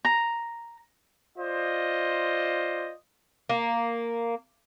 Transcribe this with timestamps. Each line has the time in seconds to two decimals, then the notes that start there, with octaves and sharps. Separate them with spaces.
0.05 A#5
1.37 F4 C5 D5 D#5
3.49 A#3